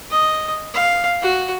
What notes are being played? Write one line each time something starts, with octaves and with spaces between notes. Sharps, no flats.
D#5
F5
F#4